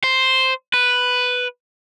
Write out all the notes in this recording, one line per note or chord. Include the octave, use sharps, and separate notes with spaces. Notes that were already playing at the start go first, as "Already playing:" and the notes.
C5
B4